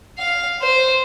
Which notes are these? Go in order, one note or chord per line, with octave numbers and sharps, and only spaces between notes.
F5
C5